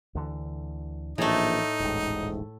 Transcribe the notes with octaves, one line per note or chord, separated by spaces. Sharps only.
D2 D3 E3
A#1 A2 E3 A3 D#4
D#1 A1 G#2